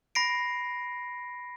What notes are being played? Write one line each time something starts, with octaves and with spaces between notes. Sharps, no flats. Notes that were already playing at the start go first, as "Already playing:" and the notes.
B5 A#6 C7 D7